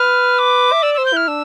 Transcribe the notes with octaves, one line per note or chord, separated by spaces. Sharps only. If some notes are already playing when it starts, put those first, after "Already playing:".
Already playing: B4 F6
D6
E5
D5 E6
C5 E6
G6
E4 F6
D4 E6